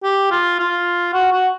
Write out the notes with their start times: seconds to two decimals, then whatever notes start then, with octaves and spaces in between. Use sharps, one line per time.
0.04 G4
0.31 F4
0.59 F4
1.13 F#4
1.32 F#4